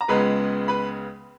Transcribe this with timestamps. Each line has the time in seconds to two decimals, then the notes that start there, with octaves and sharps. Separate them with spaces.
0.01 A#5
0.08 C#2 C#3 G#3 B3 B4 B5
0.68 B4 B5